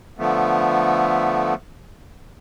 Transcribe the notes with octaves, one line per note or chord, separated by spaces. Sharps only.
D3 F3 A3 B3